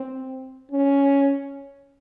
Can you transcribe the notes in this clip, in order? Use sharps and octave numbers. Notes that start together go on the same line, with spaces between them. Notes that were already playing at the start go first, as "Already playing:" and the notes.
Already playing: C4
C#4